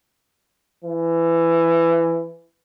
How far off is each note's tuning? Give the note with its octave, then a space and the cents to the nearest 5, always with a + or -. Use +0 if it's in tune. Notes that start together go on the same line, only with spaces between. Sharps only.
E3 +20